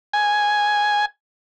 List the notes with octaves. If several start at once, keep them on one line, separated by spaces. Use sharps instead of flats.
G#5